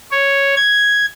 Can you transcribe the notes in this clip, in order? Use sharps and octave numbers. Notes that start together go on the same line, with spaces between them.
C#5
G#6